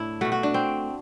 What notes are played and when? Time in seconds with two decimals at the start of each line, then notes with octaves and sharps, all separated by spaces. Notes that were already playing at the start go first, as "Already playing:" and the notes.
Already playing: A2 D4 E4
0.21 B2 A3 F#4
0.32 F#4
0.43 D4
0.54 C4